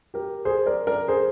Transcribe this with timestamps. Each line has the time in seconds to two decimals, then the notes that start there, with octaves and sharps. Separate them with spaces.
0.14 G4 A#4
0.45 G#4 C5
0.66 A#4 D5
0.87 A#4 D5
1.08 G#4 C5